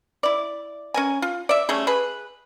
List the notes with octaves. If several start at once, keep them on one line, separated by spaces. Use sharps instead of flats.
E4 D5
C#4 A#4 G#5
F4
D5 E5
G3 A3 C#4 G#4
G#4 B4